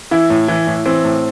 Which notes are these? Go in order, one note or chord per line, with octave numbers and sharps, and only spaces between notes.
E3 E4
A2
E3
A2
E3 C4
A2